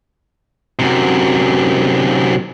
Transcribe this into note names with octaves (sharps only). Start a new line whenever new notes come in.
F#2 C3